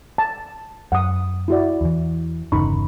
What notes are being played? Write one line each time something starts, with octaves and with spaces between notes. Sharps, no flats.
A5
F#2 F#5 D#6
E4 F#4 D5
E2 E3
G1 E2 C#3 D#4 B5 C#6